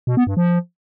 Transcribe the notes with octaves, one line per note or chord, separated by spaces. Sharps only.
B2
B3
G2
F3